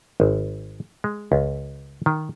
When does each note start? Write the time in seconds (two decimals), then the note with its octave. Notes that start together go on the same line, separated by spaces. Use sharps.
0.20 G#1
1.04 G#3
1.32 C#2
2.06 D#3